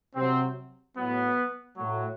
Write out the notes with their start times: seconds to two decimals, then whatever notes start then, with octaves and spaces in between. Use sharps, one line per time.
0.15 C3 F#3 C4
0.96 A2 F#3 B3
1.76 A2 F#3